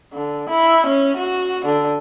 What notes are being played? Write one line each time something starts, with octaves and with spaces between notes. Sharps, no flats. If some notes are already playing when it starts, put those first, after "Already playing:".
D3
E4
C#4
F#4
D3